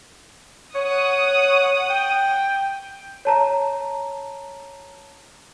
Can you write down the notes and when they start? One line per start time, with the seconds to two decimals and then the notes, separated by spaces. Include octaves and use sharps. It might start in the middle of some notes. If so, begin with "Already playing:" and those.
0.75 C#5 F#5 D#6
1.90 G5
3.25 C#5 A5 A#5